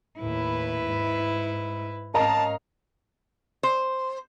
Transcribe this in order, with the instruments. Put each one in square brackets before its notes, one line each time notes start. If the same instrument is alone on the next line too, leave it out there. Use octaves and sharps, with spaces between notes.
[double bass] D#2 A2 [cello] E4 B4
[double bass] G#2
[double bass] G#2 [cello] C#4 F5 [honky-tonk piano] A#4 D#5 A#5 [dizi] A5
[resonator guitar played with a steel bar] C5